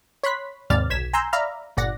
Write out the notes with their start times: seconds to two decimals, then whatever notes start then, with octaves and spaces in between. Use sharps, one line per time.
0.23 C#5 B5 C6 F#6 B6
0.70 D#2 G#2 C3 D5 F6 A6
0.90 B1 G#6 B6 E7
1.13 G#5 A#5 C6 E6 G6
1.33 D5 E5 F5 A#5 B5 F6
1.77 G1 A#2 D5 F#5 A#6